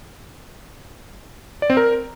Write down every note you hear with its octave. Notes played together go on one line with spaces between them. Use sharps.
D5
C4
A#4